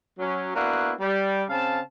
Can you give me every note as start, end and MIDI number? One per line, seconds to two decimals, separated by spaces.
0.19 0.52 54
0.19 0.52 61
0.55 0.93 58
0.55 0.93 59
0.55 0.93 62
0.55 0.93 64
0.55 0.93 66
1.00 1.44 55
1.50 1.80 49
1.50 1.80 60
1.50 1.80 77
1.50 1.80 81